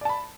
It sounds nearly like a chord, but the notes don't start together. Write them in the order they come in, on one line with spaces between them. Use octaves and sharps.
D5 A5 B5